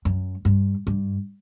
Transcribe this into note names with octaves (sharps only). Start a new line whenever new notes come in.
F#2
G2
G2